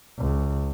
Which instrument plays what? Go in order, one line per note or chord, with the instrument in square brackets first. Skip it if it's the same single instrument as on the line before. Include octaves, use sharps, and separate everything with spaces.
[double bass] C#2